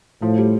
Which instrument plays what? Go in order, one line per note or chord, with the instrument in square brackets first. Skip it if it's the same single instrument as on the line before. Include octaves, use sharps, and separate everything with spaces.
[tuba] A2 [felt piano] F3
[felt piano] G3